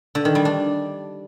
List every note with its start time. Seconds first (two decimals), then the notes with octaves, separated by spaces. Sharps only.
0.15 D3
0.25 D#3
0.35 G3
0.45 D4